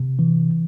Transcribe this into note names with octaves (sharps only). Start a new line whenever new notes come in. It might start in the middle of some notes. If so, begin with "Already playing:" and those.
Already playing: C3
E3